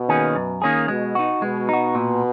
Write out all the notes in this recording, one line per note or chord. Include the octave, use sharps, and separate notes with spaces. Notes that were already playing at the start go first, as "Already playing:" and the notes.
Already playing: B2
D#3 A#3 C#4 G#4
F#2
D#3 A#3 C#4 G#4
B2 G#3
D#4 F#4
B2 G#3
D#4 F#4
A#2